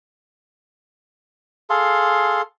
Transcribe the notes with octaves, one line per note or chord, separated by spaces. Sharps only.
G#4 A4 F5 C6